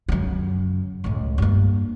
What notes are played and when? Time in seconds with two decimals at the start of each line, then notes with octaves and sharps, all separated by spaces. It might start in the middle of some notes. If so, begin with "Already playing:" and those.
0.09 F#2 C#3
1.04 C#2 A2
1.38 G2 A#3